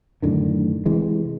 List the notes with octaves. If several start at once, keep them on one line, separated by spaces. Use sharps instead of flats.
F#2 A2 D3 D#3
C3 E3 G#3